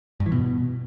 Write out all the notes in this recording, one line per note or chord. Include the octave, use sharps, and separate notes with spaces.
G2
E3
B2